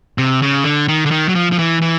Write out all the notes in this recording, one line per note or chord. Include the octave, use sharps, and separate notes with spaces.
C3
C#3
D3
D#3
D3
D#3
F#3
F3
F3
E3
E3